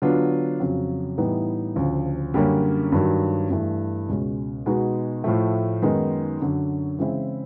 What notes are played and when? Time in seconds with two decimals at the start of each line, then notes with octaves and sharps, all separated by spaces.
0.02 D3 F#3 B3 D4 F4
0.60 F2 C#3 F#3
1.18 A2 E3 G3 B3 D#4
1.76 D2 C#3 F3
2.34 F#2 D3 G3 A#3 C#4
2.92 G2 D#3 F#3
3.51 G2 E3 A3
4.08 C#2 B2 G#3 C#4
4.66 B2 G#3 B3 D#4 F#4
5.24 A2 F3 A3
5.82 F#2 D#3 G#3 B3 D#4
6.40 F#2 D3 F#3
6.99 C#3 E3 G#3 C4 E4